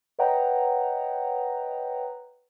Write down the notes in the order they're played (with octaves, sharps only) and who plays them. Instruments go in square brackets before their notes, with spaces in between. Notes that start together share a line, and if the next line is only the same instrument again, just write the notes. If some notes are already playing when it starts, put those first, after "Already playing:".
[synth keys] B4 C#5 D#5 F#5 G5 A#5